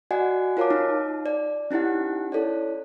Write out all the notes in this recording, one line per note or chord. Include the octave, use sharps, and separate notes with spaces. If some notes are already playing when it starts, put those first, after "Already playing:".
F#4 D5 D#5 F#5 G#5
F4 A#4 C#5 F5 A5 D6
D#4
D5
C#4 D#4 E4 G4 F#5
E4 A4 C#5 D5